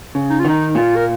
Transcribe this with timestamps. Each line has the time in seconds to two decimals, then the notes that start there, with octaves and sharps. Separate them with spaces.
0.15 C#3
0.30 D#4
0.40 F4
0.45 D#3 D#4
0.75 A#2 F4
0.96 A#4